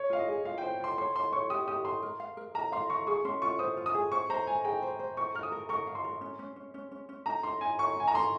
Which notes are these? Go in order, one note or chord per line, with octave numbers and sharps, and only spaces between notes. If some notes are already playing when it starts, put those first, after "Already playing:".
Already playing: C#5
F4 F5
D#5
G#4
F4 F5
C5 G5
F4 C6
C#5 C6
C#5 C6
C#5 C#6
G4 D#6
G4 D#6
A#5 C6
A#4
F5
A#4
A#4 A#5
F5 C6
F5 C#6
G#4 C#6
C#4 C6
F4 C#6
C5 D#6
F4
D#6
G#4
C5 C#6
C5 A#5
G#5 A#5
G#4 G5
C5
C5
A#4 C#6
A#4 F6
D#6
A#4
A#4 C#6
F5
C6
A#4
C#4
C#4
C#4
C#4
C#4
C#4
D#4 A#5
D#4 C6
D#4 G#5
C#5 C#6
D#4 G#5
A#5
D#4 C6